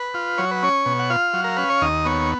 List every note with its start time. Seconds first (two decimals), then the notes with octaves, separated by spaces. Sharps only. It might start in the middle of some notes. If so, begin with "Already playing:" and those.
Already playing: B4
0.14 F4
0.38 F#3 C#5
0.51 B4
0.63 C#4 C#5
0.86 B2
0.99 F#5
1.10 F4 F5
1.34 F#3
1.44 A#4
1.57 C#4 B4
1.70 C#5
1.82 D#2 D#5
2.05 B3 C#5